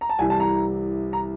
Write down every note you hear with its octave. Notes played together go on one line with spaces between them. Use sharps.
A#5
A5
C2 C3 E3 G#5
A5
A#5
A#5